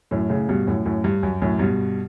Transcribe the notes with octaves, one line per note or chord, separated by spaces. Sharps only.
F#2 A2
A2 C#3
G2 B2
F#2 A2
F#2 A2
G2
F#2
F#2 A2
G2 B2